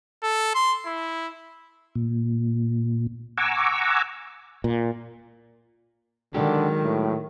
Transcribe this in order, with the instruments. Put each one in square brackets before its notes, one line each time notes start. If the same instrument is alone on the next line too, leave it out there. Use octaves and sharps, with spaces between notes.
[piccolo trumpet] A4
C6
E4
[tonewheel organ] A#2
F#5 G#5 A#5 C#6 D6 E6
[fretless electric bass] A#2
[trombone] D3 [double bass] D#3 [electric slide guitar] F#3 G#3 G4
[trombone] A2